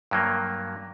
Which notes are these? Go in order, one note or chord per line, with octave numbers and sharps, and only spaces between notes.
G2 F#3 A#3